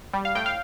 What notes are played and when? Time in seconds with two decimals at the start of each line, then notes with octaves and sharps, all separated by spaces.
0.13 G3
0.25 F5
0.35 A2 G5
0.46 F5